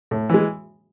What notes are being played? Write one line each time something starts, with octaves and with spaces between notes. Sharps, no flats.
A2
E3 G#3